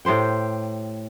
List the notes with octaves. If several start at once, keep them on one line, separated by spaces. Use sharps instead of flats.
A2 G4 C5 G5